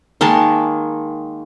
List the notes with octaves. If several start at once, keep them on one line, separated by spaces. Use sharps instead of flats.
D#3 G#3 A#3 A5